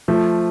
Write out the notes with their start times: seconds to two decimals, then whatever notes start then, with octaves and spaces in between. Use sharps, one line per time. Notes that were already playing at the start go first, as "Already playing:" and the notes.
0.08 F3 A3